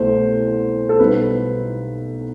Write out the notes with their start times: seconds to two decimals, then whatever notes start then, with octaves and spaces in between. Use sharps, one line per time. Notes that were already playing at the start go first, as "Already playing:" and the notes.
Already playing: C2 B2 A3 C5
0.89 A4
1.00 B1 B2 G3 B4